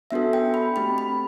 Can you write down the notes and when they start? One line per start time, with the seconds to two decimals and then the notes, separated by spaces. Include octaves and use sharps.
0.11 B3 D4 F#4 A4 E5
0.33 G5
0.54 B5
0.76 A3 C4 G4 B5
0.98 B5